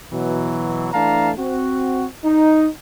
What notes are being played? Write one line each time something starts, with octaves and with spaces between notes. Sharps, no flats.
B2 E3 F#3
E3 A3 D4 F5 A5 A#5
C4 F#4
D#4